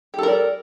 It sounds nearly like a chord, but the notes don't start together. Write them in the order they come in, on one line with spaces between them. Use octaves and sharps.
G4 A4 A#4 D5